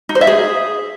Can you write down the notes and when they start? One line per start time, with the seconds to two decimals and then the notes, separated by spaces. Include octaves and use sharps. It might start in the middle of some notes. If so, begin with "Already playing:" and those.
0.09 D#4
0.15 C5
0.21 E5
0.27 G#4